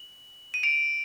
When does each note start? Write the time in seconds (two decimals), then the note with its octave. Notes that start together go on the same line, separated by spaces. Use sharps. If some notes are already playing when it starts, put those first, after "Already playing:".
Already playing: F#7
0.54 D#7
0.63 D7 F7